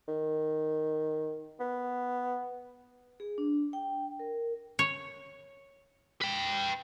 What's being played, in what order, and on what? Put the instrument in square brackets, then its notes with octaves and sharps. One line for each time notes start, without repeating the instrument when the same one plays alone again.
[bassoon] D#3
B3
[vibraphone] G#4
D4
G5
A#4
[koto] C#5
[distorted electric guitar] B4 G5